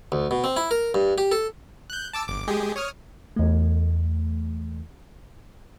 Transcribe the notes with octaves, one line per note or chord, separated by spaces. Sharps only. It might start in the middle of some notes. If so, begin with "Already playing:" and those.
D2
B2
C4
E4
A#4
G2
G4
A4
F#6 G6
A5 D6 E6
G1 D6
G#3 G4 G#4
C#5 D#6 F6
E2 A3